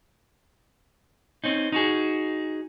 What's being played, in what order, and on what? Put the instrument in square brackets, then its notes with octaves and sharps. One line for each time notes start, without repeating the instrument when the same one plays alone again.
[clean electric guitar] C4 C#4 D#4
D#4 F#4 G#4